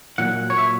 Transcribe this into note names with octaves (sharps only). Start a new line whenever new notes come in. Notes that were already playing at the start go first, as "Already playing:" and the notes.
A#2 F#3 F#5
C#5
E5